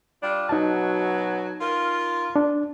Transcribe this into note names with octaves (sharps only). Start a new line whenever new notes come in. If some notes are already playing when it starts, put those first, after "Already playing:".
G3 D4 F4
B2 F#3 D#4 A5
F4 A#4
D4